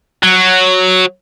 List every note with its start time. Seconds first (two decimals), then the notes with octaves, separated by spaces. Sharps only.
0.23 F#3